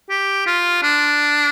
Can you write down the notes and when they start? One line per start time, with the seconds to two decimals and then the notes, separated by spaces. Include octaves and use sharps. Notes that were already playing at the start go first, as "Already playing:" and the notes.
0.10 G4
0.47 F4
0.82 D4